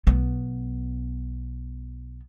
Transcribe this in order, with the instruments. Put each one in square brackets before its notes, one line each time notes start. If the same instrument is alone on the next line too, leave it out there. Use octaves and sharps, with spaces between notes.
[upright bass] B1 B3